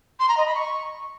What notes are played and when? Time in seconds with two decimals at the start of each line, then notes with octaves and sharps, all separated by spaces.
0.20 C6
0.29 A#5
0.37 D#5
0.46 B5
0.55 C#6